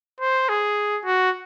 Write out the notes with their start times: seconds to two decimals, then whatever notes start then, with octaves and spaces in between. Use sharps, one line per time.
0.21 C5
0.49 G#4
1.05 F#4